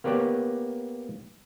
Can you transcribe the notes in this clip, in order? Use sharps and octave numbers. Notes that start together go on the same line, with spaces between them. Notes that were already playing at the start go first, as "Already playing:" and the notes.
A#3 B3 G4 C#5 D5